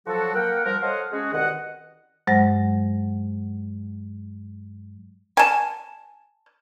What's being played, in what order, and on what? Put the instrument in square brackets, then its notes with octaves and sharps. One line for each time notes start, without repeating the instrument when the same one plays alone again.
[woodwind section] F3 F#3 F#4 A4
A#3 A#4 F#5 G5
F3 G3 A#4
A4 C5 C#5 D#5 F5 F#5
G#3 C#4 F#4 G#4
C2 B2 D#3 D#5 F#5
[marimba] G2 F#3 G#3 C5 F#5 A#6
[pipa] G#5 A5